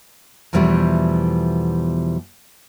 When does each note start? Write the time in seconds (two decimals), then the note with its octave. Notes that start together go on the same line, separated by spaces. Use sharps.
0.53 E2 B2 E3 F3 G3 A3